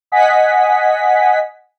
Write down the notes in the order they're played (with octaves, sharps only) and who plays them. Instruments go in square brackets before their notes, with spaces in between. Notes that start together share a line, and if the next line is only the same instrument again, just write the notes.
[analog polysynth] D#5 F#5 G#5 B6